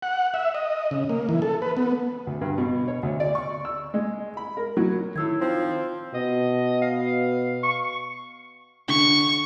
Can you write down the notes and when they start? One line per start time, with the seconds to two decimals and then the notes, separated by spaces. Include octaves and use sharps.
0.02 F#5
0.34 E5
0.54 D#5
0.91 C#3
1.09 A#3
1.29 E3
1.42 A4
1.62 B4
1.77 B3
2.27 D2
2.41 G2
2.58 B2
2.88 C#5
3.03 D2
3.20 D5
3.35 C#6
3.65 E6
3.94 G#3
4.37 B5
4.57 A#4
4.77 F#3
5.16 A2 D#3 E4 E6 G#6
5.41 F3 C4
6.14 B2 D#5
6.82 F5
7.63 C#6
8.89 D3 C#6